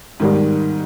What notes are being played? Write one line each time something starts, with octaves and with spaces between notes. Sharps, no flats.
G#2 D#3 G3